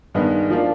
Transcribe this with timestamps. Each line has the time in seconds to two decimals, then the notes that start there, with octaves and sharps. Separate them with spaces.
0.14 G2 D#3 G#3 B3
0.50 F3 A#3 D4 F4